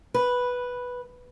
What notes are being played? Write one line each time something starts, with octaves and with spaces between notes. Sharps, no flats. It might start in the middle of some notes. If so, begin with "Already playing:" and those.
B4